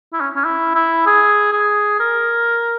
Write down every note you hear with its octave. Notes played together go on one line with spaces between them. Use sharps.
E4
C#4
C#4
E4
E4
G#4
G#4
A#4